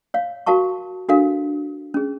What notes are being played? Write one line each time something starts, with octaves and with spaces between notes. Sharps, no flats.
C#5 F5
F#4 A#4 F5 A5 C#6
D4 F#4 A4 A#4 F5
C#4 G#4